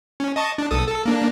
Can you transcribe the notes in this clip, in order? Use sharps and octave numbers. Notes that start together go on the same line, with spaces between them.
C#4
D#5 A5 C#6
D4
B1 A4 D#6
A4
A#3 D4